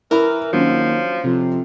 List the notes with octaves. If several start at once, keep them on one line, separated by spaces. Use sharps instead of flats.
E3 E4 A#4 B5
D#2 F3 F#3 C#4 D4 F4
F2 C3